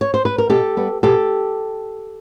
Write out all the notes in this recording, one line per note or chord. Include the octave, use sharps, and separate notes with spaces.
C#5
C5
B4
A#4
B2 G4 A4
G3 B3
B2 G4 A4